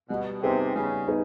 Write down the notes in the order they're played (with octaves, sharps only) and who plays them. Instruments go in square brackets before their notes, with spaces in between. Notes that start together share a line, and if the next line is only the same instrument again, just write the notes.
[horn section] B2 [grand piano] G3
[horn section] C3 [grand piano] B3 D#4 G#4 B4
[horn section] C#3 [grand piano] G3
[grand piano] B3 D#4 G#4 B4